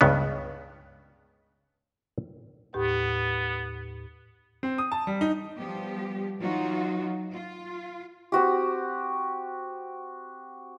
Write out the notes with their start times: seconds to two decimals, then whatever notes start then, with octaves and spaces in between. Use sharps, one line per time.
0.01 C#2 G2 C#3 B3
2.74 D#2 A2 B3 G4
4.63 C4
4.78 D#6
4.92 A5
5.07 G3
5.21 D#4
5.57 F3 G3 B3 G4
6.38 E3 F#3 D#4 F4 F#4
7.34 F4
8.32 C4 F#4 G4